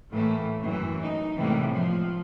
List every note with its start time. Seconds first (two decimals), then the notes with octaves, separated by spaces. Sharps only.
0.12 A2 E3 A3 A#3
0.62 F#2 E3
1.01 D#4
1.39 A2 C3 E3 G3 G#3 A#3
1.72 F3